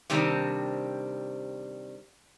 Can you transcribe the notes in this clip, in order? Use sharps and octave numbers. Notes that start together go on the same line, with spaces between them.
C3 D#3 G3 C4 D4